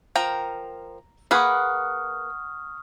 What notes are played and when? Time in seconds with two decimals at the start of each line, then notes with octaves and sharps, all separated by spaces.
0.16 F3 A#4 G5 A#5
1.31 A#3 G#4 B4 F#5 C#6 D#6 F6